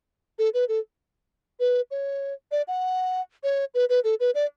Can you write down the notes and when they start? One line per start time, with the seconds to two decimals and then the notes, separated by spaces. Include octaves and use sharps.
0.39 A4
0.54 B4
0.69 A4
1.60 B4
1.91 C#5
2.51 D5
2.68 F#5
3.43 C#5
3.74 B4
3.89 B4
4.04 A4
4.20 B4
4.35 D5